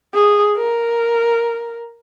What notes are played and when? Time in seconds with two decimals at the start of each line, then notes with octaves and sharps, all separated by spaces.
0.14 G#4
0.56 A#4